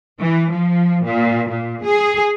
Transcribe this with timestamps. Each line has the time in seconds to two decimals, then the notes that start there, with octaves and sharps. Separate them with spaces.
0.19 E3
0.50 F3
1.04 A#2
1.48 A#2
1.84 G#4